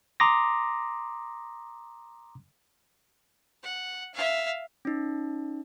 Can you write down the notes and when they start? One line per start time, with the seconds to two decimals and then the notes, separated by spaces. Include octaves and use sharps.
0.20 A#5 C6 D6 D#6 A#6
3.63 F#5
4.14 E5 F5
4.85 C#4 D#4